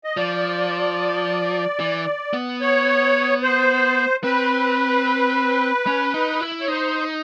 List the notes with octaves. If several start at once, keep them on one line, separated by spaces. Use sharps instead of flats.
D#5
F3 D5
E3
B3
C#5
C5
C4 B4
C#4
D#4
E4
C#5
D#4 C5